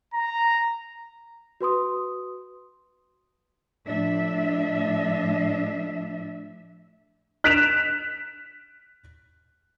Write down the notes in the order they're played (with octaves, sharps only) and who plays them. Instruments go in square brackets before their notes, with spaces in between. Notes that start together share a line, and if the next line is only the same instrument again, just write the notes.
[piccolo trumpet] A#5
[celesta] F#4 B4 C6 D#6
[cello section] A2 F3 D4 E5
[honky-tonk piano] F#6 B6 D7 E7 F7